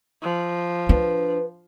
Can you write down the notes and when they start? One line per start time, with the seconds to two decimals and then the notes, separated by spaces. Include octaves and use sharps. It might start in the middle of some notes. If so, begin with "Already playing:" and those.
0.22 F3
0.89 D4 B4